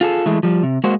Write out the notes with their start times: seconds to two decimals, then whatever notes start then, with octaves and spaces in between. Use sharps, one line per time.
0.01 F4 G#4 A4
0.26 E3 G#3 A3
0.43 F3 G3
0.63 C3
0.84 G#3 A#3 F#4 C5